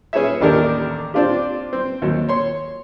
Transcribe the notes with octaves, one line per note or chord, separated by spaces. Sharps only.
C#4 G#4 B4 C#5 E5
A1 D#2 D4 G4 A#4
C4 D4 F4 G4
C4
D#2 F#3
C#5 C6